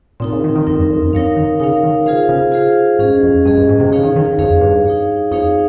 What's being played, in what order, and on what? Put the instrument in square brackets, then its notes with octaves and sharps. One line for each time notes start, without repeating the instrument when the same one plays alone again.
[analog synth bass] A#2 [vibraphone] C4 D#4 A#4
[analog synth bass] C#3
D#3
D#3
[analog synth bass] F2 [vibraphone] C4 D#4 A#4
[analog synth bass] G2
F2
F2
[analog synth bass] G2 [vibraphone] D#4 A#4 C#5 F5
[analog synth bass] D#3
[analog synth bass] C#3 [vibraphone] D#4 A#4 C#5 F5
[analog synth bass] D#3
[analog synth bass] C#3 [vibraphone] F4 G#4 C5 F5
[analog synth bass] C#3
[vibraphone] F4 G#4 C5 F5
[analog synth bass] G#2 [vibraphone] C#4 G#4 D#5
[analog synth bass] F2
[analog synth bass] G2 [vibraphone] C#4 G#4 D#5
[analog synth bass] G2
G#2
C3
[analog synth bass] C#3 [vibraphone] D#4 G#4 C#5 F5
[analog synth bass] D#3
D#3
[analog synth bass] F2 [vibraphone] D#4 G#4 C#5 F5
[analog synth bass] G2
[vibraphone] D#4 G#4 C#5 F5
[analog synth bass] F2 [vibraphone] D#4 G#4 C#5 F5